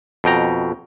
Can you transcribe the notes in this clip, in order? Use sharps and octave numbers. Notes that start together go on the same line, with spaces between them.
F2 B2 G5 A#5